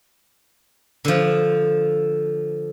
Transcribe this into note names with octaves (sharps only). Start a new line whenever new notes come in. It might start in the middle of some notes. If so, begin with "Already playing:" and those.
D3 F3